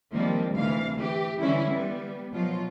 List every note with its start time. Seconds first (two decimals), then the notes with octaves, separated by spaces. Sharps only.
0.12 D#3 F3 G3 A#3 C4
0.52 D2 C3 E3 F5
0.97 E3 G4
1.39 D3 E3 G3 C#4 E4
1.69 G3 B3
2.32 B2 F3 F#3 F4